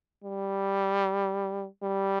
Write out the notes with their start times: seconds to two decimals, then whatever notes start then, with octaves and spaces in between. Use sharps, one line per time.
0.24 G3
1.83 G3